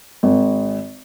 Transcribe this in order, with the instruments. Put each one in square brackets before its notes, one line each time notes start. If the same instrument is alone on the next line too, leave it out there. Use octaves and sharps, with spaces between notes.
[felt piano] G#1